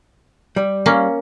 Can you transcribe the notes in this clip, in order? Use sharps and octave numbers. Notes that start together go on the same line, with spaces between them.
G3
A#3 C#4